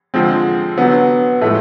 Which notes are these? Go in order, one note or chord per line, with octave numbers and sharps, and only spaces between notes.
D3 F3 G#3 C4
D3 F#3 B3
A2 F3 G#3 A3